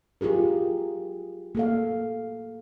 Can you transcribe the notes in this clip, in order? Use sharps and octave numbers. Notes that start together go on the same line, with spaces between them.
F#3 F4 G4 G#4 A#4
A#3 A4 F5